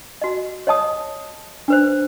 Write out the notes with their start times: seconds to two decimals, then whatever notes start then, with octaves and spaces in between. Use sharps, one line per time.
0.22 F#4 D#5
0.67 C#5 D#5 A5 D#6
1.68 D4 B4 C5